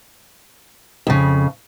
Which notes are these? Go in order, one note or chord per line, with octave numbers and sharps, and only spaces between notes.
F2 C#3